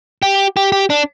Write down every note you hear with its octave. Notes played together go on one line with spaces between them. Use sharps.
G4
G4
G4
D4